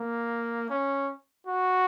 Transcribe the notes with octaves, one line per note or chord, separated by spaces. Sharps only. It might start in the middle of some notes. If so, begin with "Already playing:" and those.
Already playing: A#3
C#4
F#4